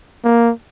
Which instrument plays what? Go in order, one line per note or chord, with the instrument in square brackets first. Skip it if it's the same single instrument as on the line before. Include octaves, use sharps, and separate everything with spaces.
[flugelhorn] A#3